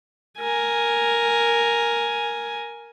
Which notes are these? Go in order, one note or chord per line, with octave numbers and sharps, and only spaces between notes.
A#4 G#5